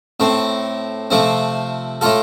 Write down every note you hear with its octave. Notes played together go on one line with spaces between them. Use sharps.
A2 A3 C4
C3 F3 A3 C4
A2 A3 F4 A4